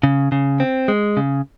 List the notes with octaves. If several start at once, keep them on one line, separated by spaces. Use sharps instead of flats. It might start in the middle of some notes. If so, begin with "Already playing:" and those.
C#3
C#3
C4
G#3
C#3